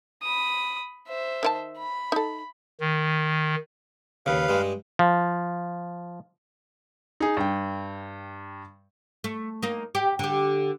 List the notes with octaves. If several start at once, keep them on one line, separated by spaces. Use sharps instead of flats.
B5 D#6
C5 E5
D#3 E4 A5
B5
D#4 A4
D#3
D#2 C#3 B4 F5
G2 G#3
F3
D#4 G#4
G2 G5
A3
A#3 D#4
G4
D3 G4